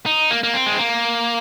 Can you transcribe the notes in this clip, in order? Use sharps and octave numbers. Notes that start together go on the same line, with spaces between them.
D#4
A#3
A#3
C4
G#3
A#3